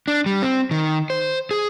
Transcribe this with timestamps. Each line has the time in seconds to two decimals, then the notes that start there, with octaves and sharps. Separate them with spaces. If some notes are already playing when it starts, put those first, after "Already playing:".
0.08 D4
0.26 G3
0.42 C4
0.71 D#3
1.10 C5
1.51 G#4